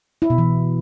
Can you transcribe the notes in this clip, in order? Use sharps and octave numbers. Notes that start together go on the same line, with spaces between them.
E4
B2
E3